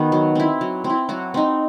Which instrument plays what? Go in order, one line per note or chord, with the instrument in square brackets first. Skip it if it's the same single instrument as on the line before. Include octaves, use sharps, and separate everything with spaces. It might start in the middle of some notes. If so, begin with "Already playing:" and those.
Already playing: [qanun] D#3 B3 F#4
F#3
C4 E4
F#3
C4
E4
F#3 F#4
C4 D#4